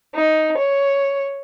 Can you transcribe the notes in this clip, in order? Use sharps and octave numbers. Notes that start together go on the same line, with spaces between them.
D#4
C#5